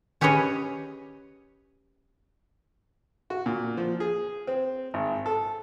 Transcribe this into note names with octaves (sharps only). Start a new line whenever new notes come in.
C#4 G4 G#4 B4 C#5 D#5
F#4
A#2
F3
G#4
C4
G#1
A4